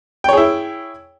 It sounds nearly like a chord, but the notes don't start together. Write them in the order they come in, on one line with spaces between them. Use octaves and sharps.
G5 C#5 G#4 E4